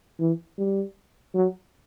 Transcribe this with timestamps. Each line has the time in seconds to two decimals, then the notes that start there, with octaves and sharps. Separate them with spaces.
0.20 E3
0.59 G3
1.34 F#3